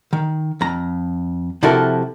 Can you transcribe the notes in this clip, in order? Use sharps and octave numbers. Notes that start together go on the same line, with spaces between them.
D#3
F2 A#5
C3 F3 E4 F#4 A4 A#4